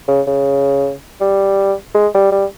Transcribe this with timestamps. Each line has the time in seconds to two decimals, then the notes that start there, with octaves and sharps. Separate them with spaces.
0.08 C#3
0.27 C#3
1.21 G3
1.95 G#3
2.15 G3
2.32 G3